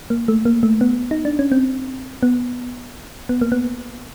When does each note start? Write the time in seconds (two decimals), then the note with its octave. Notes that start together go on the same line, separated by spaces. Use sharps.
0.10 A#3
0.28 A3
0.45 A#3
0.63 A3
0.81 B3
1.11 D#4
1.25 D4
1.39 C#4
1.52 C4
2.23 B3
3.29 B3
3.41 A#3
3.52 B3